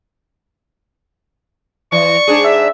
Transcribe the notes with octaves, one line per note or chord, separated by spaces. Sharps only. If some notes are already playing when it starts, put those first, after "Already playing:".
E3 D5 C#6
G#2 D4 G#4
E5